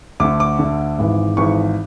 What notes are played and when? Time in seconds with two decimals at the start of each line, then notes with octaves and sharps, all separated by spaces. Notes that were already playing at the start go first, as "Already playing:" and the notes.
0.20 D2 D3 D6
0.40 D6
0.59 D2 D3
0.98 G#1 G#2 E3
1.37 G#1 G#2 E3 C#6